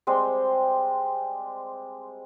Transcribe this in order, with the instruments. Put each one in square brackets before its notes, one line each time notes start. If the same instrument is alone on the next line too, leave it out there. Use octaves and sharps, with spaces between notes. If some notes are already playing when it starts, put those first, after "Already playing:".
[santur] G3 G#3 C4